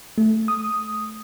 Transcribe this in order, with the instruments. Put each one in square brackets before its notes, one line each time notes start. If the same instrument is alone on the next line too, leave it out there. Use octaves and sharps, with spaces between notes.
[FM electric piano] A3
D#6